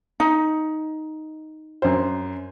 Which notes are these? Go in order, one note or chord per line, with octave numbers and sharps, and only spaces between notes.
D#4
F#2 C5